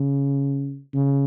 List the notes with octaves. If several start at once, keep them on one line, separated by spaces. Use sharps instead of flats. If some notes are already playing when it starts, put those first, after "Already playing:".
Already playing: C#3
C#3